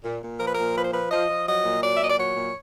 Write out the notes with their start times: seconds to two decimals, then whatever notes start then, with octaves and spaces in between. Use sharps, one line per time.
0.04 A#2
0.22 A#2
0.39 F3 A#4
0.46 B4
0.54 A#2 A#4
0.75 F3 B4
0.83 C5
0.93 F3 B4
1.11 F3 D#5
1.28 F3
1.46 F#3 D#5
1.64 A#2
1.82 F#3 D5
1.95 E5
2.00 A#2 D#5
2.10 D5
2.17 F#3 C#5
2.36 A#2